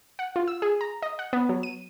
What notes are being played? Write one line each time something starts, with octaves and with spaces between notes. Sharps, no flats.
F#5
F4
E6
G#4
A#5
D#5
F#5
B3
F#3
D#7